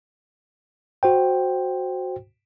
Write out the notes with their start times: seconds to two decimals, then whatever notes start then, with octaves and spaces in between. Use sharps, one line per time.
1.03 F#4 C5 G5